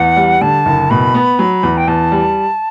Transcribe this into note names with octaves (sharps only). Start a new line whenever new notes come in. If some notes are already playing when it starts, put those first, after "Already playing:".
Already playing: E2 F#5
G3
D3 A5
F#1
B2 B5
B3
F#3
E2
G5
E2 A5
G3